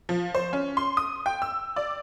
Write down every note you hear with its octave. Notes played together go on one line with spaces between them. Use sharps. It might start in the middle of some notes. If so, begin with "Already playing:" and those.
F3
C5
C#4
C6
D#6
G5
E6
D5